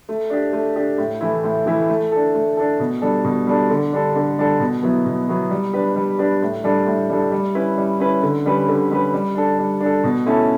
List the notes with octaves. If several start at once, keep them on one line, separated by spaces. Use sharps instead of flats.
A3
D4 G4
A3
D4 G4
A2
E3 A3 E4
A2
E3 A3 E4
A3
D4 A4
A3
D4 A4
B2
G3 D4 A4
B2
G3 D4 A4
D3
G3 D4 A4
D3
G3 D4 A4
B2
F#3 B3 E4
B2
F#3 B3 E4
G3
D4 G4 B4
G3
D4 G4 B4
A2
G3 D4 A4
A2
G3 D4 A4
G3
C#4 E4 B4
G3
C#4 E4 B4
D3
G3 C#4 G4 B4
D3
G3 C#4 G4 B4
G3
D4 A4
G3
D4
A4
B2
A3 C#4 E4 A4